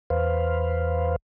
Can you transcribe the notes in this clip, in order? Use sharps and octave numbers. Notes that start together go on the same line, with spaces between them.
E2 B4 C5 F5